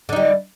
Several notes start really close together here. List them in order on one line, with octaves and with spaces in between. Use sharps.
D3 D#4 G3